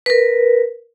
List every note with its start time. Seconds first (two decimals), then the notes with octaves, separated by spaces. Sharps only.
0.06 A#4 B4